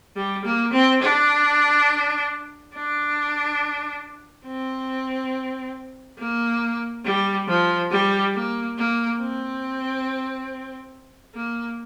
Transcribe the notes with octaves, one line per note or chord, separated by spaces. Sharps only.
G3
A#3
C4
D4
D4
C4
A#3
G3
F3
G3
A#3
A#3
C4
A#3